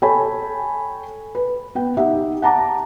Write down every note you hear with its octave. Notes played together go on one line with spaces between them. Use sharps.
A4 C#5 G5 G#5 B5
B4
B3 G5
D#4 G4 E5 F#5
F#5 A5 A#5 D6